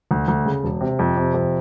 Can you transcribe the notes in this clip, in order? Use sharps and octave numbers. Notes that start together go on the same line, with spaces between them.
D2
D2
C#3
E1
C3
F2
C3
F2